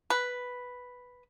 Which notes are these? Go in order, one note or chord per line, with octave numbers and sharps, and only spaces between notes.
B4